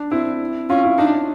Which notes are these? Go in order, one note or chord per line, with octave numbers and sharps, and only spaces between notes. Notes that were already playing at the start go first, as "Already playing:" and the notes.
Already playing: D4
C4 E4
C#4 F4
E4
D4 D#4